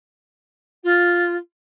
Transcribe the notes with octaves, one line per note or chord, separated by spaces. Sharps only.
F4